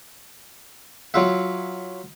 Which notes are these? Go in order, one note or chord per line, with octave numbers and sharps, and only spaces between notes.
F#3 F4 E5